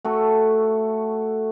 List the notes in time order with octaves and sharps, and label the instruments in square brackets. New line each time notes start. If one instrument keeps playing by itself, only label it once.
[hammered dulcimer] A3 F#4 A4